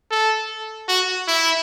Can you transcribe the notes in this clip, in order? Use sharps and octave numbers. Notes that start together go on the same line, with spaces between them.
A4
F#4
E4